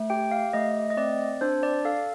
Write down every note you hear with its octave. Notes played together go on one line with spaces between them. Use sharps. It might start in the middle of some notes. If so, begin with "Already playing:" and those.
Already playing: A3
G4 G5
F5
A3 D#5
D#5
C4 D5
D4 C5
D5
A4 F5